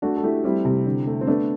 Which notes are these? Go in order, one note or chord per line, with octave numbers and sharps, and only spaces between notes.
A3 D4 F#4
A4
A3 E4 G4
G3 C4 E4
C3
D3
A3
C4
A3 B3 D4